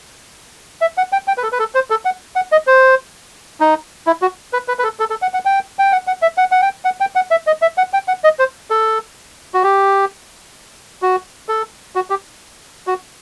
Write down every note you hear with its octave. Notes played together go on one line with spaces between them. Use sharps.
E5
F#5
G5
G5
B4
A4
B4
A4
C5
A4
F#5
F#5
D#5
C5
D#4
E4
F#4
B4
B4
B4
A4
A4
A4
F#5
F#5
G5
G5
F#5
F#5
E5
F#5
F#5
G5
F#5
G5
F#5
E5
D#5
E5
F#5
G5
F#5
D#5
C5
A4
F#4
G4
F#4
A4
F#4
G4
F#4